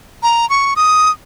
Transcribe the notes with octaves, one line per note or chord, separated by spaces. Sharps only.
A#5
C#6
D#6